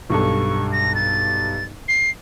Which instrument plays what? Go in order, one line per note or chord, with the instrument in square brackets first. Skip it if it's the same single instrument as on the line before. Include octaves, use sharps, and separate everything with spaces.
[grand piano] B1 G2 A4 [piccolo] C#6
[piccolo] A#6
A6
C7